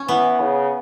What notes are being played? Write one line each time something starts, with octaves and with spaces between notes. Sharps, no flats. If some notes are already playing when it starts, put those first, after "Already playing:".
Already playing: C#4
E3 B3
C#3